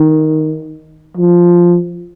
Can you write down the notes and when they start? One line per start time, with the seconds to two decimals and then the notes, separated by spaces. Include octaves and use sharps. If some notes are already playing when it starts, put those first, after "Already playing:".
Already playing: D#3
1.17 F3